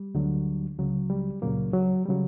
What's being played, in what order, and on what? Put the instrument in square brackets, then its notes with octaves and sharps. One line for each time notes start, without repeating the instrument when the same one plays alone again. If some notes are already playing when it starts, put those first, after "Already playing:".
Already playing: [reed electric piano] G3
D2 D3 F#3
C#2 C#3 F#3
G3
C#2 A#2 C#3 F#3 A#3
F#3
C#3 F#3 G3